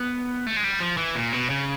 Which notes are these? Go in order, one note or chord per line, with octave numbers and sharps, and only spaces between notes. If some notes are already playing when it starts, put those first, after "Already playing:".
Already playing: B3
A3
G#3
G3
F3
E3
A#2
B2
C#3